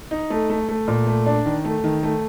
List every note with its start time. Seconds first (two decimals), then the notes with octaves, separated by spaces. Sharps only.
0.11 D#4
0.30 A3
0.50 A3
0.69 A3
0.88 A#2
1.07 A3
1.26 D4
1.46 D#3
1.65 A3
1.84 D#3
2.03 A3